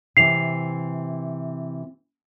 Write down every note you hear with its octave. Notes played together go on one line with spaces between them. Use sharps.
C3 E3 C7 F7